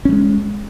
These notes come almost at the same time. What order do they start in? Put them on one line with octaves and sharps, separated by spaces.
C#4 G3 G#3